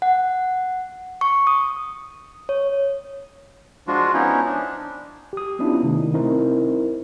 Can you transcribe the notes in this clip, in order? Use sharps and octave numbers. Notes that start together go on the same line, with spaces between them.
F#5
C#6
D#6
C#5
F3 G#3 D4 F4 F#4
F3 B3 C#4 D#4 E4
D4
G4 D#6
B3 C#4 D4 E4 F4
C3 D#3 A3 D#4 E4
C4 D#4 E4 A#4 C5